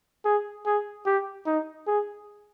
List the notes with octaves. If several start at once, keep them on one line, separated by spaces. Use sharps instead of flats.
G#4
G#4
G4
D#4
G#4